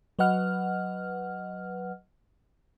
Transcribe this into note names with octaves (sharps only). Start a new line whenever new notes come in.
F#3 B4 D#5 F#5 F6